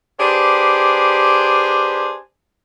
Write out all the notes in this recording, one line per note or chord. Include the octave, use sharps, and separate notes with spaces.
D4 G4 G#4 B4 C5